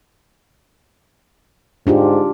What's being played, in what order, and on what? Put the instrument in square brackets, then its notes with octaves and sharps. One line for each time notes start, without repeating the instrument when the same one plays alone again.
[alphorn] G#2 [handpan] D4 F4 G4